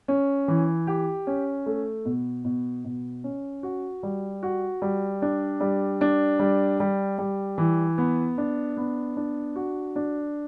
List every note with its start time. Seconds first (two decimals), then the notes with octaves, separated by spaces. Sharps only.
0.08 C#4
0.48 E3
0.87 G4
1.27 C#4
1.66 A3
2.05 B2
2.45 B2
2.85 B2
3.24 C#4
3.63 F#4
4.03 G3
4.43 F#4
4.82 G3
5.22 D4
5.60 G3
6.01 D4
6.39 G3
6.80 G3
7.18 G3
7.58 E3
7.98 B3
8.38 D4
8.77 B3
9.17 D4
9.56 F#4
9.96 D4